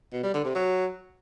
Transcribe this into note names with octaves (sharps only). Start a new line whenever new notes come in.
B2
G3
D3
C3
F#3